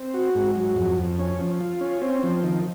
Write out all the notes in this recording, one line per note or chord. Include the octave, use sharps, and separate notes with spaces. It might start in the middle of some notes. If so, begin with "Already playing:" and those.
Already playing: C4
F#4
G#2
F#3
F2
F2
C#4
F3
F4
C#4
C4
F3
D#3